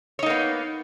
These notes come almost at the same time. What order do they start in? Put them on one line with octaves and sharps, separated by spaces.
C#5 D#4 A#3 B3